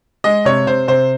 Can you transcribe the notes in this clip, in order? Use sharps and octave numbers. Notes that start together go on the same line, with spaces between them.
G#3 D#5
C3 C#5
C3 C5
C3 C5